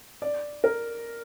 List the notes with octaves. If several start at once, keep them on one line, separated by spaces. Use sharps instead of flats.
D5
A#4